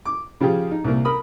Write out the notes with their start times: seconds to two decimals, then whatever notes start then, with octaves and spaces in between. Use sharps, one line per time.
0.05 D6
0.40 C#3 F3 F4 G4 G#4
0.71 D#4
0.84 C2 A#3
1.05 A#4 B5 D#6